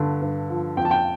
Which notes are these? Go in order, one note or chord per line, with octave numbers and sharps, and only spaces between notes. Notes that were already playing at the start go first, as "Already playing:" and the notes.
Already playing: G2 D3
G2
F3
F2 G5
A5
G5